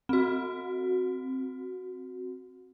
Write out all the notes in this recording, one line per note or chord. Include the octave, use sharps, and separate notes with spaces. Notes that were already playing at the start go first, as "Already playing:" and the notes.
C4 F#4